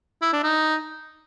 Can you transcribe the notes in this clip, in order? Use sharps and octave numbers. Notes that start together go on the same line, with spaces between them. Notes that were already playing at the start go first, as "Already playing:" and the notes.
E4
D4
D#4